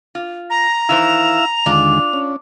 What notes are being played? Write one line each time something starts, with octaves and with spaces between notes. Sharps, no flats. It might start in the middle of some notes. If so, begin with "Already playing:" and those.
F4
A#5 A#6
D#3 E3 E4 C5 F5 E6 F7
D#2 D3 G#3 D4 F4
C#4